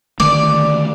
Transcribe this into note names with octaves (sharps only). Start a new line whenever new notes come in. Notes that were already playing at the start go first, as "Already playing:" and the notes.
D3 D#3 A3 D5